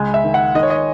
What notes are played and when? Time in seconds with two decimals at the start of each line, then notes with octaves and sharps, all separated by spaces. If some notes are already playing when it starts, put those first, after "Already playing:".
Already playing: C#2 G#3
0.14 E5
0.24 D#3
0.34 F#5
0.55 D#3 D#5
0.63 C#5
0.70 D#5